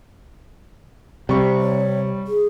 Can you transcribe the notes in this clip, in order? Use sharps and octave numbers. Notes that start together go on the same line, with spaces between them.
C3 G3 C#6
C#5
G#4